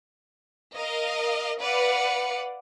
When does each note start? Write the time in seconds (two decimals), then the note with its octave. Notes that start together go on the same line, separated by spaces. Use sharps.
0.75 A#4 D#5 F5
1.60 B4 D5 F5 F#5 C#7